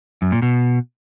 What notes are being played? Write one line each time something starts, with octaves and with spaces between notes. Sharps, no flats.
F#2
A#2
B2